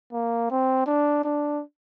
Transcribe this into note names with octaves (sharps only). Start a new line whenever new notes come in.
A#3
C4
D4
D4